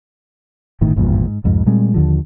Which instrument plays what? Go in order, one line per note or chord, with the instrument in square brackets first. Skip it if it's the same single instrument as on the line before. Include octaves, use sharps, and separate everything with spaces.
[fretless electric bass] G1 A2 D#3
G#1 E2 G2 A#2
G#2
C2 F2 G#2
A#2 G3 G#3 C4
D#2 D3 F3